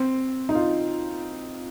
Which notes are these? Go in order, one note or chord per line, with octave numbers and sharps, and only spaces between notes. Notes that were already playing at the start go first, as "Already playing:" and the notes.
Already playing: C4
D#4
F4